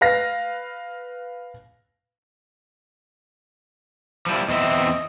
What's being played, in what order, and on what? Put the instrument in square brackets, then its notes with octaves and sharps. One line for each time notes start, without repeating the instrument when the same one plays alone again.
[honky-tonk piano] B4 F5 A#6
[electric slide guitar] F3 G3 E4
[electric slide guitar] E2 C4 E5 [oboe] D#5